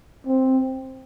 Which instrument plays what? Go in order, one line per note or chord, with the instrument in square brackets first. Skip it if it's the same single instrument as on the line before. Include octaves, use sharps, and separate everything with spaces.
[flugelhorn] C4